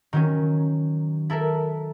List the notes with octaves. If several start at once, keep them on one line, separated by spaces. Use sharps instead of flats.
D#3 F#3 C#4
E4 A4 A#4 E5